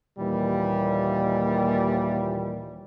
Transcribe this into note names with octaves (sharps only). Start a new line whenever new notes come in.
D#2 A#2 E3 G3